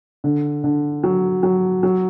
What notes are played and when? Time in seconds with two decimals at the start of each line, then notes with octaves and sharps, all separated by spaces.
0.24 D3
0.64 D3
1.04 F#3
1.43 F#3
1.83 F#3